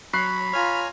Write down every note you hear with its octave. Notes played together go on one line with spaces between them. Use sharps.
F#3 C#5 B5 C#6 F#6 C7
F4 C#5 G#5 A#5 F6